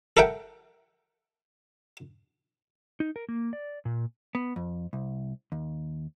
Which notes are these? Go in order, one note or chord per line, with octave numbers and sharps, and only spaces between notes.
A4 A#4 E5 F#5 G5
D#4
A#4
A#3
D5
A#2
B3
F2
C2
D#2